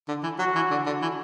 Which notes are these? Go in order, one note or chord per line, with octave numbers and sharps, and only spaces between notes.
D3
E3
F#3 F#4
E3
D3
D3
E3